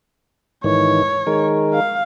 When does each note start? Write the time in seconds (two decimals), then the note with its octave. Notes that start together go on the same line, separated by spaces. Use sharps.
0.64 G#2 D#3 E3 C#5
1.27 D#3 G#3 A#4
1.73 F5